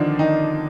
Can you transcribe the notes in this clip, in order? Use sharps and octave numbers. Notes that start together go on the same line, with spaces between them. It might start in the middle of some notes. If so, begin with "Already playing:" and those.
Already playing: D3 D#3 F3 D4 D#4 F4
D#3 D#4